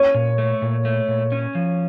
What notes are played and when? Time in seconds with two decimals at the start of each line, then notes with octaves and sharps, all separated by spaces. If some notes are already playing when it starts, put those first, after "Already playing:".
Already playing: C#4 C#5
0.15 A#2
0.38 A3
0.62 A#2
0.85 A3
1.08 A#2
1.32 C#4
1.55 F3